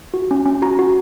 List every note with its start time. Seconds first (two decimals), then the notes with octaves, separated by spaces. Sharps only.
0.14 F#4
0.31 C#4
0.46 C#4
0.62 F#4 A#5
0.79 F#4